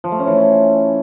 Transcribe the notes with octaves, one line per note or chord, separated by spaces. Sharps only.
F3
A3
C#4
E3
C#4